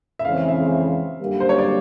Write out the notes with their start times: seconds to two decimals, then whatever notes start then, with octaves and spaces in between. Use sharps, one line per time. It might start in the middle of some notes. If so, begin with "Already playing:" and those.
0.19 E5
0.24 F2 C#3 E3 G#3 C4 F5
0.49 E5
1.20 F#2 D3 G3 A#3
1.40 C5
1.49 C#5
1.58 D5